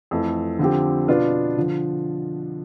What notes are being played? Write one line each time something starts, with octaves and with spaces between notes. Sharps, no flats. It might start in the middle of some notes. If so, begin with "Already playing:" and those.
F2 E3 A3
D3 F3 C4 G4
B2 B3 D4 F4
D3 F3